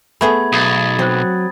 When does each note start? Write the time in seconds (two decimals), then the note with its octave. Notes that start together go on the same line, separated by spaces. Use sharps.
0.21 A3 B3 G#4 B5 G#6
0.53 B1 D#6 G#6 A6
0.99 F#3 C4 F#6